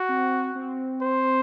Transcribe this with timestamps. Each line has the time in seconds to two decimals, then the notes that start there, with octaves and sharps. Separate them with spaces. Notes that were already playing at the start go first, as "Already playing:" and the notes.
Already playing: F#4
0.09 C4
0.55 C4
1.01 C5